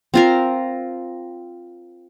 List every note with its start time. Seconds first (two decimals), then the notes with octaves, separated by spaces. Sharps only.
0.14 C4 F4 A#4